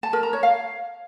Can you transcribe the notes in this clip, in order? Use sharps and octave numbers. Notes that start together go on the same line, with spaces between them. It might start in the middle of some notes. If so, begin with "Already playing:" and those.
A5
A#4
A#5
C#5
F5